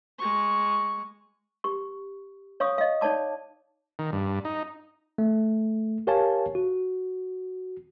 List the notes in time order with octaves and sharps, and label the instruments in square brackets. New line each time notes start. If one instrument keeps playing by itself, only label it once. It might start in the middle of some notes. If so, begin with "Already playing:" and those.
[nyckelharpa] G#3 C#6
[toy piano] G4 C#6
C#5 F5 C#6 D#6
D#5 F5
D#4 C#5 D5 A5 D6
[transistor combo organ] D#3
G2
D#4
[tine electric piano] A3
G4 A#4 C#5 F5 G#5 A5
F#4